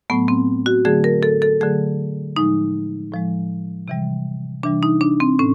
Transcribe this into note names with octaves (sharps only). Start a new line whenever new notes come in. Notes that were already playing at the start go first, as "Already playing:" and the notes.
A2 F#3 A3 B3
C4
F#4
D3 F#3 A3 G#4
A#4
A4
A4
D3 F#3 A3 G#4
A2 F3 G#3 D#4
A2 F3 G#3
C3 E3 G3
C3 E3 G3 D4
D#4
D4
C4
A2 C#4